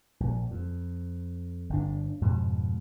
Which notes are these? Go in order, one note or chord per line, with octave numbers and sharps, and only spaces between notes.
A#1
F2
G1 D4
F2 G#2 B2